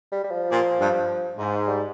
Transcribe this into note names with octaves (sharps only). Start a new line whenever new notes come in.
G3
G3
F3
A#2
G2
G#2
G3